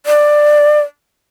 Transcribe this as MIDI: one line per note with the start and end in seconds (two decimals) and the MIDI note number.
0.06 0.80 74